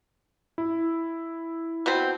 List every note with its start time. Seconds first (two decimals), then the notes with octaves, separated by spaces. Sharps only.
0.58 E4
1.86 B2 B3 C4